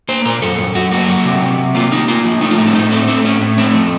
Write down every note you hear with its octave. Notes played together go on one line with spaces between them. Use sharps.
A#3 C5
A#2 A#4
F#2 A4
F#2
F#2 F#4
A#3 F#4
F#3
C3
C3
C3
A#3 F4
A#3 D#4
A#3 F4
F3
A3 D#4
F4
A2 D#4
C4
A2 D#4
A3 C4
A3 C4
A2 C#4
A2
A3 C4
F3